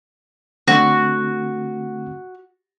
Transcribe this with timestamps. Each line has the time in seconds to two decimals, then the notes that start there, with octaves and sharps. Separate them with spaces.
0.68 D3 A3 C4 F#4